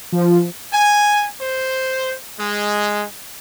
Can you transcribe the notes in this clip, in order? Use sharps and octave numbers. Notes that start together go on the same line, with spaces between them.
F3
G#5
C5
G#3